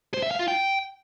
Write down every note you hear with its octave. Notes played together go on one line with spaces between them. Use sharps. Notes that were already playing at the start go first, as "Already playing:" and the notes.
C5
E5
F5
F4
G5